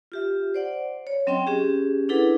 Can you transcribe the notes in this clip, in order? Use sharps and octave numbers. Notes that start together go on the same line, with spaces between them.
F4 G4 E5
C5 D5 F#5
C#5
F#3 C4 C#4 D#5 G5 C6
C#4 G4 G#4
D4 E4 G#4 A4 B4 F#5